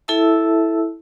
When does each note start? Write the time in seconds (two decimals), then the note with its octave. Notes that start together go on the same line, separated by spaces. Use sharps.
0.08 E4 A4 E5 A5 E6